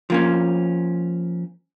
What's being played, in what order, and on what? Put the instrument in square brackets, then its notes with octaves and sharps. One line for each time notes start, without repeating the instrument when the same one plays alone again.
[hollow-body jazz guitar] F3 A#3 C#4